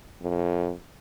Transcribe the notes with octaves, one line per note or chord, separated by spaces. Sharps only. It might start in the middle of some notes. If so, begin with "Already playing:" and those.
F2